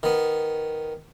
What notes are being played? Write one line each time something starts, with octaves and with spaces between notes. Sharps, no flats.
D#3 B3